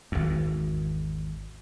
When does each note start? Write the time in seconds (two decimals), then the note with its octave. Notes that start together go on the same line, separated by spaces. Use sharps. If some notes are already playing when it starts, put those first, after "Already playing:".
0.12 G#1 E2